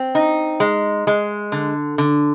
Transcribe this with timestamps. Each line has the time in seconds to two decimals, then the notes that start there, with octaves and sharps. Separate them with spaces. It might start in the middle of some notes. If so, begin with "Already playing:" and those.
Already playing: C4
0.15 D#4
0.60 G#3
1.07 G#3
1.52 D3
1.98 D3